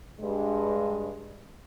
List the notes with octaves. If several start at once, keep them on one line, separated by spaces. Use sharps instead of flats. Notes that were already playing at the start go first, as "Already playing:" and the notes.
G2 G#3